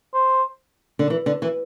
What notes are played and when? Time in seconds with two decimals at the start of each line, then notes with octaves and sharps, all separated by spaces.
0.14 C5
0.99 D3
1.10 E3
1.26 D3
1.42 E3